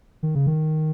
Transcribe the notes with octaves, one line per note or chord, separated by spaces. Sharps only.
D#3
C#3
D#3